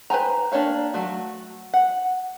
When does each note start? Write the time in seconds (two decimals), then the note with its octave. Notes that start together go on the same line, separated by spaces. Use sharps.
0.10 B4 C5 G5 G#5 A#5
0.52 A#3 D4 G4 C#5 F5
0.94 F#3 A3 F#4
1.74 F#5